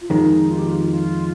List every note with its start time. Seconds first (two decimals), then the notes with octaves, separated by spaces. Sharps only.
0.01 F4
0.09 F2 D#3 G#3 D#4
0.49 F4
0.58 G4
0.68 F4
0.89 F4